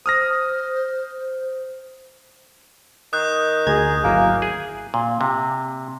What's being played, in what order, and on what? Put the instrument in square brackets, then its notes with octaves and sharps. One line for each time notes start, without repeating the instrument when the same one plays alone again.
[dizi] C5 [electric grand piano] D#6 F6 A#6
[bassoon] D#3 [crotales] D#6 F#6 G6
[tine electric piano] D2 A#5 G#6 [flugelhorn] G#4
[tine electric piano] G#1 F#3 E4 [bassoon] A#3 [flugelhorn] G#5
[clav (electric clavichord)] G#4
A#2
C3